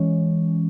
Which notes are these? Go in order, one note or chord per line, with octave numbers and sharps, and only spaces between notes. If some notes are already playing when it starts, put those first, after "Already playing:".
Already playing: E3 G#3 C#4